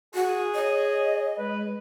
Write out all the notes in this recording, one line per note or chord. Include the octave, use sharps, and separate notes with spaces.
F#4 G#4
C#5 D#5
G#3 B4